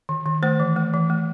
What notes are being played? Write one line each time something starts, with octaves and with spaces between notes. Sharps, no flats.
D#3
D#3
A3 C5
E3
A3
E3
A3